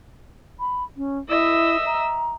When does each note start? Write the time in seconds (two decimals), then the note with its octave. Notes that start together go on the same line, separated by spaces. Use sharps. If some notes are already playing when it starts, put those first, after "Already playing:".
0.60 B5
0.97 C#4
1.29 E4 D#5 E5 E6
1.86 A#5